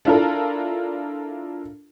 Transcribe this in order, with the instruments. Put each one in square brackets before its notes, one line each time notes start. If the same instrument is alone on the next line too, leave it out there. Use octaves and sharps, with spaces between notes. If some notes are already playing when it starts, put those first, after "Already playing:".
[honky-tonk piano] D4 E4 F4 A4 A#4